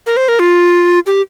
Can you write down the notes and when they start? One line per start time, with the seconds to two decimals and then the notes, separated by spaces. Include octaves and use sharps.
0.06 A#4
0.17 C5
0.28 A#4
0.39 F4
1.06 G4